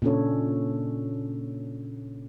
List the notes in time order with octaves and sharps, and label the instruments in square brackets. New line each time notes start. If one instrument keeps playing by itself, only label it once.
[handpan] A#2 C#3 C#4 D4 A4 C#5